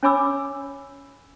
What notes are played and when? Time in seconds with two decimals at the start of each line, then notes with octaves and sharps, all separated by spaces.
0.03 C#4 C#5 G#5 B5 D6 E6